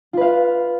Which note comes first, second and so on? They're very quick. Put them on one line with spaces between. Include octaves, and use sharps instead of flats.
F4 B4 F5